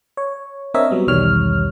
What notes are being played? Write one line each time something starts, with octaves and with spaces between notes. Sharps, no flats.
C#5
C4 D4 A#4 C#5 D#5 E5
F#3 G3 B3
B1 E2 D#3 G3 C#5 F6